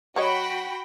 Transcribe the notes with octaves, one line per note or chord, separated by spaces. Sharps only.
F#3 F#4 C#5 D#5 G5 B5